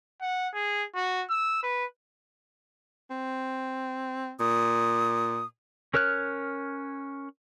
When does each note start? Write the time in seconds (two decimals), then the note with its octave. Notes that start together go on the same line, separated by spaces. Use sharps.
0.21 F#5
0.54 G#4
0.95 F#4
1.30 E6
1.63 B4
3.11 C4
4.40 A#2 D#6
5.94 C#4 A#4 C#5 F6 F#6